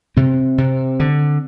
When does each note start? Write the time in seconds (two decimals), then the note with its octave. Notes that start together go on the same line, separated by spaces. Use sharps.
0.17 C3 C4
0.58 C3
1.00 D3